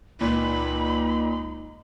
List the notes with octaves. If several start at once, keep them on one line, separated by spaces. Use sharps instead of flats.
C#2 A#2 D#4 B5